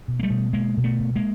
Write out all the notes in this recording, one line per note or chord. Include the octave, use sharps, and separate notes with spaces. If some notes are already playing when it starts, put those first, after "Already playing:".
B2
A#3
G3 A3
B2
B2 G#3 A#3
B2
A3 B3
B2
G#3 A#3